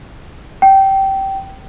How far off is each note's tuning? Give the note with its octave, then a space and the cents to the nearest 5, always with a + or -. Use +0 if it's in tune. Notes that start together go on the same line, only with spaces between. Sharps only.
G5 -15